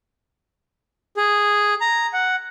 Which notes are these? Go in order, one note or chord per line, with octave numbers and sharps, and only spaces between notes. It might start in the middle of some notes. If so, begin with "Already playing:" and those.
G#4
A#5
F#5